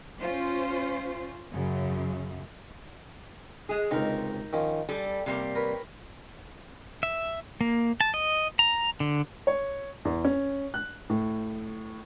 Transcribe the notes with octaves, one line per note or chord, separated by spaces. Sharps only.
C#4 F4 C5
F#2 C#3
G#3 G#4
C#2 C3 D#4 A#4
D#3 F3 C#4
G3 A4 G#5
C3 G3 A#3
A#4 B4 C#5
E5
A#3
A5
D#5
A#5
D3
C#5
E2
C#4
F#6
A2